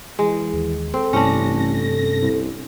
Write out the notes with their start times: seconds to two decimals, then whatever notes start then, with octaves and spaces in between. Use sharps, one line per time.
0.19 E3 G#3
0.53 D#2
0.94 C4 A4
1.13 A1 G2 C3 C#4 D4 A#6
2.22 C2